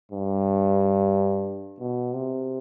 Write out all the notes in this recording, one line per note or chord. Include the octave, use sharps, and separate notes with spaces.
G2
B2
C3